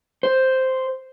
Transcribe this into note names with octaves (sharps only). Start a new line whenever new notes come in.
C5